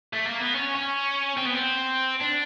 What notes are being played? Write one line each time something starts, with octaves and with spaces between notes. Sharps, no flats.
A3
A#3
B3
C#4
C#4
C4
B3
C4
D4